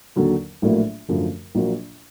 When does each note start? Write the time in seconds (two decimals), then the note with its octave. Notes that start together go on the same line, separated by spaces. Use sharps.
0.16 D#2 D3 F#3
0.62 A#1 A2 F#3 A#3
1.08 F#2 D3 F3 A3
1.55 A#1 A#2 F#3 A#3